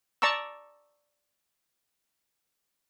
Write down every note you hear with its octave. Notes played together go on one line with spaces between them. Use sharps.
D5 A5 A#5 C#6 E6